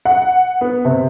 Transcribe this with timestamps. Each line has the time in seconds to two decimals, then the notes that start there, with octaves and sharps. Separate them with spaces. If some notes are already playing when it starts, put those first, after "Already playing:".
0.05 F#5
0.61 B3
0.85 C3